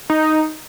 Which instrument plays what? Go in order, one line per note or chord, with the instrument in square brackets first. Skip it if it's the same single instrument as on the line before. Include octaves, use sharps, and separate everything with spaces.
[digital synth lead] D#4